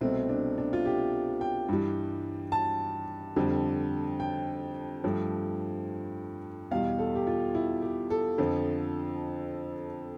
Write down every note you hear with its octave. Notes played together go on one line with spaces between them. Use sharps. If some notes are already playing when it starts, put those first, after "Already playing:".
C2 B2 A3 C4
D4
D4
F4
G4
G5
G2 E3 G3
A5
F2 D3 G3
G5
G2 F3 A3
E2 B2 G3 F5
A4
G4
F4
E4
G4
A4
F2 D3 F3